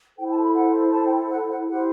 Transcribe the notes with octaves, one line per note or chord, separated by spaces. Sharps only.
E4 A4 C5 G5
A5
B5
F#5
A5
G5
F#5
F#5
E4 G4 C5 F#5